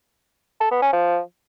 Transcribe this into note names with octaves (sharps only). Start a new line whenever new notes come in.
A4
B3
C#4
F3